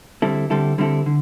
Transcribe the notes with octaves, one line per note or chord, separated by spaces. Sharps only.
D3 G3 C4 E4 A4
D3 G3 C4 E4 A4
D3 G3 C4 E4 A4
D3